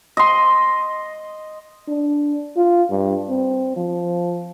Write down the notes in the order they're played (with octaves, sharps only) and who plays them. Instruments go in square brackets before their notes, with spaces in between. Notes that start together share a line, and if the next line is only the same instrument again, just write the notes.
[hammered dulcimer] D#5 C6
[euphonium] D4
F4
G2
C4
F3